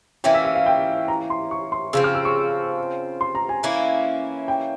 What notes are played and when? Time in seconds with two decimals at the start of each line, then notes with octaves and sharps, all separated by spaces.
0.24 E3 A#3 C#4 G5
0.34 E5
0.45 E5
0.55 F5
0.66 G5
1.08 A#5
1.30 C6
1.51 C#6
1.72 C6
1.93 C#3 F3 C4 E6
2.04 F6
2.15 E6
2.25 C#6
3.21 C6
3.35 A#5
3.49 G#5
3.63 E3 A#3 C#4 E4
4.48 G5